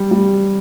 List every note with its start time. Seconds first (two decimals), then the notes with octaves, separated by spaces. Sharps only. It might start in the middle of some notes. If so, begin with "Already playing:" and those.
Already playing: G3
0.11 G3